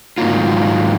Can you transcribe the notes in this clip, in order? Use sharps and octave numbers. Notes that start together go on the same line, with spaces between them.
G#2 D#3 F3 F#3 A#3 F4